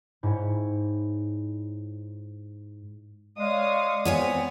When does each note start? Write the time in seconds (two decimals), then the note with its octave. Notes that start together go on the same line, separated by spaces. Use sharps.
0.23 G#2 E4 C#5 G5
3.38 G#3 C#5 D5 F5 D#6
4.05 B3 C4 C#5 G#5